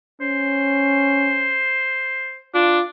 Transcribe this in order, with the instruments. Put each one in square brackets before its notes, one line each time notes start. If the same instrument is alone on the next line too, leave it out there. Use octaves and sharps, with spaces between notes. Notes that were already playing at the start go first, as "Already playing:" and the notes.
[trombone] C#4 [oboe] C5
[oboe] D4 [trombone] F4